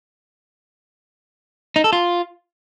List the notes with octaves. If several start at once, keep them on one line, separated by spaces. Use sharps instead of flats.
D#4
A4
F4